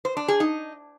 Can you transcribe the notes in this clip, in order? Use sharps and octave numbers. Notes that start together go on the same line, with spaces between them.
C5
D4
G#4
D#4